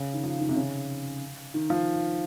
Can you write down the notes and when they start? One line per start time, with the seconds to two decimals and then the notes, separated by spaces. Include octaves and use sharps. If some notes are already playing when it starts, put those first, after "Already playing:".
Already playing: C#3
0.14 D#3
0.23 F3
0.40 D#3
0.49 C3
0.56 C#3
1.54 D#3
1.70 F3